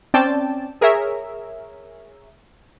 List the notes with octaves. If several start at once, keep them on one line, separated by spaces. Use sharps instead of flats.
C4 C#4 D5 G5 A5
G#4 A#4 C#5 E5